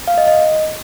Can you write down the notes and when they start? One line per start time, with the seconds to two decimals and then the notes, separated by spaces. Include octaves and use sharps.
0.08 F5
0.18 D#5
0.28 D#5